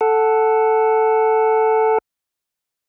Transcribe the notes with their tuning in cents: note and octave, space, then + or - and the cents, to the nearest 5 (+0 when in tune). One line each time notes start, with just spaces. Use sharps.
A4 +0 F#5 +0